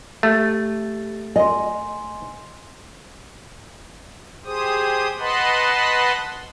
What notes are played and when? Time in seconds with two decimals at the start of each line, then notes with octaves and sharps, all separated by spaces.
0.23 A3 G4 A6
1.36 D#5 G#5 C6
4.45 G4 G#4 C5 D#6
5.19 B4 D#5 F#5 A5 B5 C6